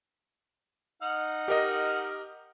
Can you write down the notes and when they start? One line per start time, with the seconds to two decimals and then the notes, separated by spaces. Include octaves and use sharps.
1.02 D#4 F#5 F6
1.48 G4 A#4 D#5